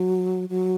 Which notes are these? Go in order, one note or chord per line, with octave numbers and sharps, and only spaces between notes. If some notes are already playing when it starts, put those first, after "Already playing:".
Already playing: F#3
F#3